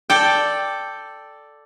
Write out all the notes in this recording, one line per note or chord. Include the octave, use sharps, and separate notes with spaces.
A4 D5 G5